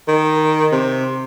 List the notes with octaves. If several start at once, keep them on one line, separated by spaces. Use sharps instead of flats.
D#3
C3